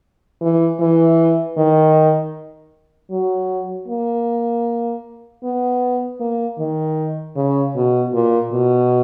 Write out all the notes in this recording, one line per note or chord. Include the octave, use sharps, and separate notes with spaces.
E3
E3
D#3
F#3
A#3
B3
A#3
D#3
C#3
B2
A#2
B2